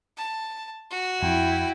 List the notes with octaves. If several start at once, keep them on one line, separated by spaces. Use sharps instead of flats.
A5
F#4
F2 E4 G5